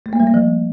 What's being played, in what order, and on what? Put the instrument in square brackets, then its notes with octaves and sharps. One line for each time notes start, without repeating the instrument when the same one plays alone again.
[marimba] A3
A#3
G3
A#3
F3